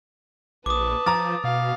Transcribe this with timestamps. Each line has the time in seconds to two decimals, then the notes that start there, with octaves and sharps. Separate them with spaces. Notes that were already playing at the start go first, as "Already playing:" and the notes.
0.66 A#1 B4 A5 D6 D#6
1.06 F3 A#5 D6 A6
1.44 B2 F5